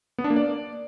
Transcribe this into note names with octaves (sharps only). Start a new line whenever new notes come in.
B3
D4
A#3
D5